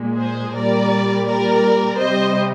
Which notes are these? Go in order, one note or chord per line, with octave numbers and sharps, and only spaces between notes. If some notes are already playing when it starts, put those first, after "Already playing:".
Already playing: A#2 G#3
G#4 C5
A#2 G3 A#4 D5
A#4 D5
C3 G3 C5 D#5